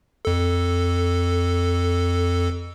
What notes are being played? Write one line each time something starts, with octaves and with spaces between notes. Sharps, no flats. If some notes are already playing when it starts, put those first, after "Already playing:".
F2 A4